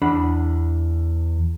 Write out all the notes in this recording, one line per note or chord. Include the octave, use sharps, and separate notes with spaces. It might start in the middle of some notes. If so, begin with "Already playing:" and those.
E2 D4 B5